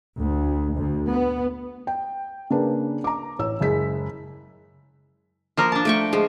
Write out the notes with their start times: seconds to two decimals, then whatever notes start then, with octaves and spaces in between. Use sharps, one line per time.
0.18 D2
0.73 D2
1.09 B3
1.87 G5
2.50 C#3 A#3 D4 B4
3.04 A#5 D6
3.39 A1 C#5 E6
3.60 F#1 G#3 B6
5.57 F3 A#3 A#4
5.72 D4 A5
5.85 A3 G5 C#6
6.13 F3 G#3